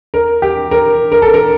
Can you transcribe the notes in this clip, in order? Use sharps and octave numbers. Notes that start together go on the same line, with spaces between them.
A#4
G4
A#4
A#4
A4
A#4